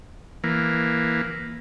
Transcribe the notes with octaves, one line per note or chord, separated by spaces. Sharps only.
E3 A#3